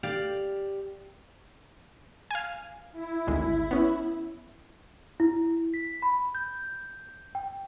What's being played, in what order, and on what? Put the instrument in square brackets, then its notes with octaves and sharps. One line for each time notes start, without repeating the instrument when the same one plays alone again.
[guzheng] G4 D5 F5
[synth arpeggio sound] F5 G#5
[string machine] E4
[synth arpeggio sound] G#1 D2 G#3
B3 C#4
[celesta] E4
B6
B5
G6
G5